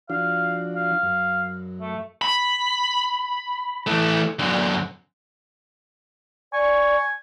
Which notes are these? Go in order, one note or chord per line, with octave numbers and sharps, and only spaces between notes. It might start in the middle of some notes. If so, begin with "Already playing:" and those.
F3 D4 F#4 F5
F5
F#2
A3
B5
E3 A3
F#2 D3
D5 G#5 C#6